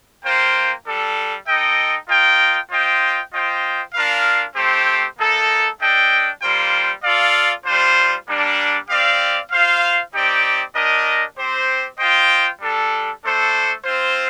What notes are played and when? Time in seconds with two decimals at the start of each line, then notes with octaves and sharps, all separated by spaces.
0.22 A#3 F4 C5 G5
0.85 G3 D4 A4
1.46 D#4 A4 D#5 G5
2.08 F4 A#4 D#5 G5
2.70 F4 C5 D#5 G5
3.32 F4 C5 D#5 G5
3.94 D4 F4 A#4 F5
4.56 A3 C4 G4 C5
5.17 A#3 D#4 A4
5.79 D4 A4 D#5 G5
6.42 G3 A#3 F4 C5 G5
7.03 F4 A4 D5 F5
7.66 G3 D4 F4 C5
8.27 G3 A#3 D4
8.89 C4 G4 D5 F5
9.51 F4 C5 F5
10.14 C4 D#4 G4 D5 G5
10.74 D4 G4 A#4 D#5
11.37 C4 G4 C5
11.99 F4 C5 D#5 G5
12.61 G3 D4 A4
13.23 A3 D4 A4 C5
13.84 C4 F4 C5